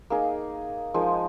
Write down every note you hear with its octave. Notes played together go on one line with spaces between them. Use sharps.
A#3 D#4 G#4
F3 G#3 D#4 A#4